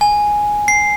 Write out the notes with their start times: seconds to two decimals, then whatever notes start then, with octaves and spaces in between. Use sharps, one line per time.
0.01 G#5
0.68 C7